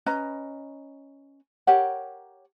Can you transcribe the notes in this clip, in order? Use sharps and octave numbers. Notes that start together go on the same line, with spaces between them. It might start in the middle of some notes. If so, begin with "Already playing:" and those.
C#4 B4 D#5 A#5
G4 A#4 C#5 F#5